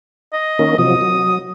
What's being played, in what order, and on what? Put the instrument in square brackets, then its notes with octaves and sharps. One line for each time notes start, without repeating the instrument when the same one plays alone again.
[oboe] D#5
[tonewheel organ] D#3 A#3 C#4
[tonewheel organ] C3 F3 F#3 [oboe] D#6
[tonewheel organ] F#3